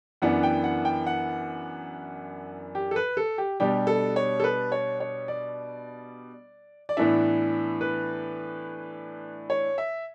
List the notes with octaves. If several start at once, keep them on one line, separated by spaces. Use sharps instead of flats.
F#2 E3 B3 D4 F#5
G5
F#5
G5
F#5
G4
A4
B4
A4
G4
B2 G3 D4 G4
A4
C#5
A4
B4
C#5
C#5
D5
D5
A2 E3 B3 D4 E5
B4
C#5
E5